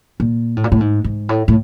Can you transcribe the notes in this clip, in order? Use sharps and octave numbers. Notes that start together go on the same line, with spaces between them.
A#2
A2
A#2
A2
G#2
G#2
A2
A2